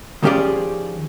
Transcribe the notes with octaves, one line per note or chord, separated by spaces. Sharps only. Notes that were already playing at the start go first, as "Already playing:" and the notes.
D#3 F3 C#4 G4 G#4 D5